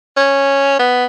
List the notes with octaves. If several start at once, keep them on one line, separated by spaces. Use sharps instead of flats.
C#4
B3